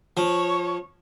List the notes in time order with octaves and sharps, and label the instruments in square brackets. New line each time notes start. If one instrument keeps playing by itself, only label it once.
[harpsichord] F3 [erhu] C#5